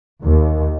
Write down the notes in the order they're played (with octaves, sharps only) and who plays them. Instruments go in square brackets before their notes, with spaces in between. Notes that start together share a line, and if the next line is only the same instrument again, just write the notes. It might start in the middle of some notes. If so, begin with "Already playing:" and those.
[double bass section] D#2